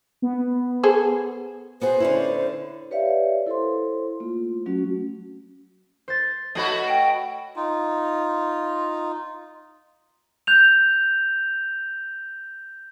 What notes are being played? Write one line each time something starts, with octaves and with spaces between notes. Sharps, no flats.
B3
G#4 A4 C5
B3 F#4 G#4 C5
D3 C#4 E4
G4 B4 C#5 D5 E5 F5
E4 A4 C5 C6
A3 A#3 F4
F#3 A3 C#4 F#4
C5 A6
A3 F#4 B4 C#5 D#5
G5
D#4 F4
F#6 G6 F7